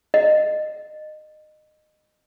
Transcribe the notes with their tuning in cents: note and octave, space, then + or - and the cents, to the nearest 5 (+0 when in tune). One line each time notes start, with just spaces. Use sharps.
D#5 -20